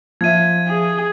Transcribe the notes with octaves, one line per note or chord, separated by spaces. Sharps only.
F3 E5 G#6 D#7
G#4